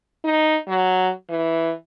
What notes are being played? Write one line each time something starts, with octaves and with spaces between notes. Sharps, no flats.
D#4
F#3
E3